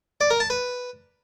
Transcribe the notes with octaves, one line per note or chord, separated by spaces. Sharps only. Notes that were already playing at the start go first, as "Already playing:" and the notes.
D5
A#4
A5
B4